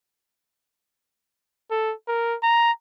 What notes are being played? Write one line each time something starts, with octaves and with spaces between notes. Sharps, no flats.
A4
A#4
A#5